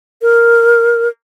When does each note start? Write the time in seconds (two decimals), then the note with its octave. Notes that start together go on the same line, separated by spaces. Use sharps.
0.22 A#4